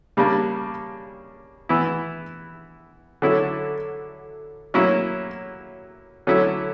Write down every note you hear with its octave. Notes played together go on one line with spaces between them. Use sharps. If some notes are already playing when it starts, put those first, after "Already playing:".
C#3 G3 A#3 D4
E3 B3 E4
D3 F#3 C#4 E4
F#3 A#3 C#4 E4
D3 F#3 C#4 E4